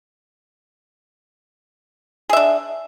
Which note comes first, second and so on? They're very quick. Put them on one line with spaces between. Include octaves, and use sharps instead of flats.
G#4 E5 D4